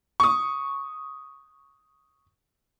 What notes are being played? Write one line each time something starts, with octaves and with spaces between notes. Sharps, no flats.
C#6 D#6